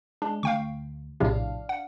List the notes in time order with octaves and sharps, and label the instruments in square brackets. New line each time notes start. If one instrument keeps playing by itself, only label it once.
[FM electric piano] G#3 [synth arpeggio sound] D4
[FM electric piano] D2 [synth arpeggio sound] F5 G5 C#6
[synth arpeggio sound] A#1 A2 C3 [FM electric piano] D4 F5
[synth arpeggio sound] F#5